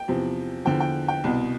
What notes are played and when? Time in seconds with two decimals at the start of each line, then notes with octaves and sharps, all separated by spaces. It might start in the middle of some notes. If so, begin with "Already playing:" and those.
Already playing: G5
0.08 E2 C3 F3
0.65 E2 D3 F3 G5
0.80 G5
1.08 G5
1.24 C2 B2